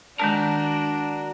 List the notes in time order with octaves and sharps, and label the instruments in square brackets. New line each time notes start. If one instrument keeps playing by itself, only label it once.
[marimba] D#3 G#3 A5 [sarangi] D4 [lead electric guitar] F#4 A#4